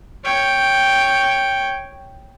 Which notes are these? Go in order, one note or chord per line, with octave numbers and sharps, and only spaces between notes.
C#5 G5